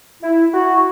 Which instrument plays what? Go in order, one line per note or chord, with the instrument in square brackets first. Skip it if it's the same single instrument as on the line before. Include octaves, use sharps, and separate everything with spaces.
[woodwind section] E4
F#4